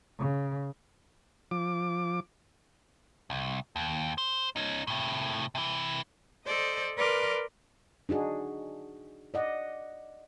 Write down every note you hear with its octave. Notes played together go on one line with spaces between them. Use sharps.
C#3
F3 D6
C2
D#2
C5
C#4 D#4
A2 C3
C3 E3
A4 C5 D5 D#5
A#4 B4 D5 C6 D6 F6
D4 D#4 F#4 G#4
D5 D#5 F#5